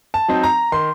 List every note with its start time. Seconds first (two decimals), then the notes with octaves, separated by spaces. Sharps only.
0.14 A5
0.28 F#3 C4 D#4
0.43 A#5
0.72 D#3 C6